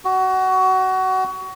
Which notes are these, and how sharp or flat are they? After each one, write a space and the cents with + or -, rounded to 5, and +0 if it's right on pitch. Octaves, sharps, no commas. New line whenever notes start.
F#4 +20